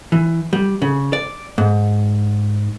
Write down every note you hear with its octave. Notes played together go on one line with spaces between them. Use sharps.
E3
G3
C#3
D5
G#2